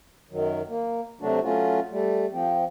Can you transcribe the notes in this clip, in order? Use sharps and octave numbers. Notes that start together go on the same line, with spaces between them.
F#2 D#3 F#3
A#3
C3 F#3 A3 D4 F#4
F#3 A3 C#4 F4 F#4
G3 A3
F3 C4